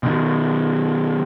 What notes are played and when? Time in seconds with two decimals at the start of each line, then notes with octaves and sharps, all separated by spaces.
0.03 B2 D#3